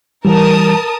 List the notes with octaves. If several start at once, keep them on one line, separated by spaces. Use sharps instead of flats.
E3 G3 A#4 A5 D#6